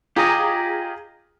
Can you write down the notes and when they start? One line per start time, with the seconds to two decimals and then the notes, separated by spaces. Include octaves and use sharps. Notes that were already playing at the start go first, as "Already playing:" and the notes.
0.16 F4 G4 G#4 D#5 A#5